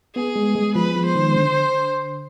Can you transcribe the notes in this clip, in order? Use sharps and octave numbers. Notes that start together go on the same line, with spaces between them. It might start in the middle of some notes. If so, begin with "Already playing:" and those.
B3 G#4
G#3
G#3
F3 B4
F3
C5
D#3
D3